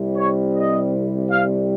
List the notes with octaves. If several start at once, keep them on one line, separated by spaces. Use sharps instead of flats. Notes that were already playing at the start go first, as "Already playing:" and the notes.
Already playing: C2 C3 G3
C#5
D#5
F5